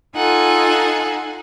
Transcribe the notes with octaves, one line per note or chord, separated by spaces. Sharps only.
D#4 F4 A4 F#5 G#5